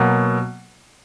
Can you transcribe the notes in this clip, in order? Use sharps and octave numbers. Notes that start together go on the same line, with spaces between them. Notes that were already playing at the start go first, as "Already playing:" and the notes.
Already playing: B2 F#3 A#3